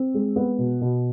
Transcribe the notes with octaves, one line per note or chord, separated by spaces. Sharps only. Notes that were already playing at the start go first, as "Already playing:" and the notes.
Already playing: C4
G#3
B3
B2
B2